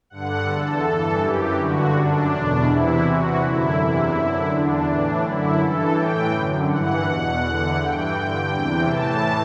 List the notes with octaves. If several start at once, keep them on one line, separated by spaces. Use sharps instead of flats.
G2 D3 F#5
E2 D3 A4
G2 E3 A4
F#2 E3 G4
G2 D3 F#4
F#2 D3 D4
E2 B2
E2 C3 E3 E4
E2 C3 E3 F#4
F#2 D3 E4
E2 C3 E3 E4
F#2 D3
E2 D3 D4
A2 E3 D4
F#2 D3 E4
G2 E3 A4
A2 E3 G5
F#2 D3
G2 E3 F#5
E2 B2
E2 D3
G2 E3 G5
G2 D3
E2 C3 E3
A2 E3 A5